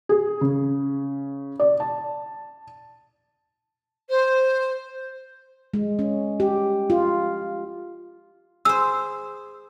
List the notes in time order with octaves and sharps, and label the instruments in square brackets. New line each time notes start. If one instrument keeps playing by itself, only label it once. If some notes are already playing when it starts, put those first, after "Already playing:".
[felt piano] G#4
C#3
D5
A5
[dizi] C5
[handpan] G#3
C#4
G4
F4
[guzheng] G#4 C5 [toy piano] E6